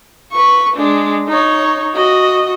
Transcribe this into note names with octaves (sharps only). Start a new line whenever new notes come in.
B4 C#6
G#3 D4
D#4 C#5
F#4 D#5